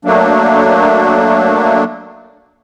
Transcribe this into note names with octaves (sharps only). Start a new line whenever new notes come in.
F#3 A3 A#3 D4